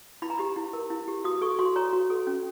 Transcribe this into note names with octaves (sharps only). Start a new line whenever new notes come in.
E4 B5
A#5
G4 B5
E4
A#4
E4
G4
F#4 D#6
A4 C#6
F#4 C6
C#5 A#5
F#4
A4
C#4